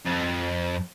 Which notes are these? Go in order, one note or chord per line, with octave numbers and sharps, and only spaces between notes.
F2